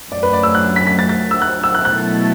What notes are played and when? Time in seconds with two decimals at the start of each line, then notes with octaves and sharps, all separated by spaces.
0.11 F#2 F#3 A3 D5
0.23 B4
0.33 D5
0.43 E6
0.55 F#6
0.76 B6
0.87 B6
0.99 A6
1.09 A6
1.31 E6
1.42 F#6
1.64 E6
1.75 F#6
1.85 B2 F#3 A3 E4 A4 F#6